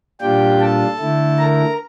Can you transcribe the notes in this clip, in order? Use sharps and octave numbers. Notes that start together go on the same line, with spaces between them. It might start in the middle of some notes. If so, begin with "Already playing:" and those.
A#2 G3 D4 F4 G4 G5
A4 A5
D3 A3 E4
A#4 A#5